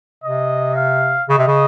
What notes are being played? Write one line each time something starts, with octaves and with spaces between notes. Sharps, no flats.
C3 D#5
F5
C#3 D#5
C3
C#3